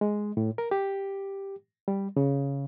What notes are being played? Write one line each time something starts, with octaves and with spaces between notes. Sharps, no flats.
G#3
A2
A#4
G4
G3
C#3